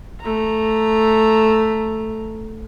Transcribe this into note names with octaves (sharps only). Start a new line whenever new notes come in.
A3 A#5